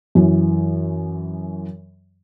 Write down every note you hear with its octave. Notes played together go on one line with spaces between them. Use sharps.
F#2 E3